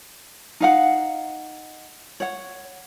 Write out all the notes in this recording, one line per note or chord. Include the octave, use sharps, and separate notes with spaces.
D#4 F5 F#5
C#5 F#5